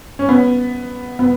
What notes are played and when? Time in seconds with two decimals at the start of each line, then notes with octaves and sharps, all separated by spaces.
0.19 C#4
0.29 B3
1.19 B3